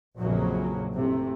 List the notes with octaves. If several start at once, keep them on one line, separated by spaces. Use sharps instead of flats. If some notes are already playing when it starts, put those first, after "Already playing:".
A#1 F2 C#3 F#3 A#3
F#1 C3 A3